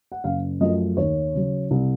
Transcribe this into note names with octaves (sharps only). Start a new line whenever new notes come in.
F#5
F#1 F5
F#2 F3 A3 D#5
D#2 C#5
C#3 F#3
C2